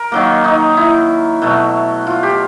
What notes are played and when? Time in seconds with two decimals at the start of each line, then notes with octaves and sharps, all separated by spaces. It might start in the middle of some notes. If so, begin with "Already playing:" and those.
Already playing: A#4
0.12 D#3 F#3 A#3
0.44 D#4
0.77 E4
1.42 B2 F#3 A3
2.07 F4
2.23 G4